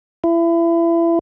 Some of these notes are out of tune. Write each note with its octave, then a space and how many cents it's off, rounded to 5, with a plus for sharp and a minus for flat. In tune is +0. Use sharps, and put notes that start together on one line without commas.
E4 +30